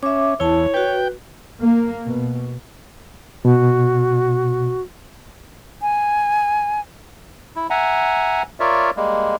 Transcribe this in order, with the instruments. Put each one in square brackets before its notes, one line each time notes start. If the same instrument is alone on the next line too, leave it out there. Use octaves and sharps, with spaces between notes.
[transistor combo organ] C#4 [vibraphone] E5 D6
[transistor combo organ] E2 [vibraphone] E4 A5 [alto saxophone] C#5
[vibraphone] F#4 B4 [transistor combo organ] G5
[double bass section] A#3
B2
[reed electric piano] B2 [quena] F#4
[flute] G#5
[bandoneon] E4
E5 F#5 G#5 A#5
F4 A#4 C#5 D5 E5
G3 G#3 A#3